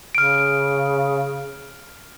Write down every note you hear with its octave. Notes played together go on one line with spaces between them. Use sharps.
C#3 F6 D7